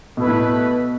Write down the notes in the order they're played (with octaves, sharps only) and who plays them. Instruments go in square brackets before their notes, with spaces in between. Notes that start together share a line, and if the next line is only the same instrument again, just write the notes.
[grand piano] B2 [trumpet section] A3 E4 B4
[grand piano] A2
B2